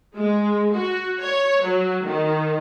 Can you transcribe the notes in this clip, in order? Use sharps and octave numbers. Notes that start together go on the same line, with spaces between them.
G#3
F#4
C#5
F#3
D#3